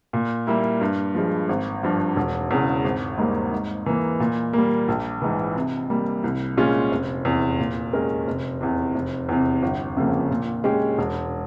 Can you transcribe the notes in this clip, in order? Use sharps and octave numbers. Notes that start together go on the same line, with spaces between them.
A#2
G3 A#3 E4
G2
F3 G#3
G#1
G2 F3
E1
E2 C#3
G#1
G#2 G3 A#3
G#2
E3 A#3
A#2
G3 A#3
A#1
G#2 E3
C3
G3 A#3
C2
A#2 G#3 C#4 F4
F1
E2 C3
A#2
G#3 C#4 G4 A#4
F1
E2 C3
F1
E2 C3
G1
F2 C#3 F3 A#3
A#2
G#3 C#4 G4
E1